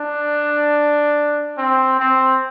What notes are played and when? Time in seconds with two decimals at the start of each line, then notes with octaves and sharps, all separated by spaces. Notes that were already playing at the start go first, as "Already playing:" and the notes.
Already playing: D4
1.58 C4
1.99 C4